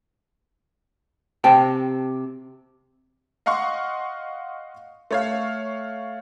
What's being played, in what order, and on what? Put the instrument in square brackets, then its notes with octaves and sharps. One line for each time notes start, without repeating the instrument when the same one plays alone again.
[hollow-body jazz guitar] C3 G5 A5
[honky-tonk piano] D#5 F5 F#5 C6 C#6
A3 C#5 F5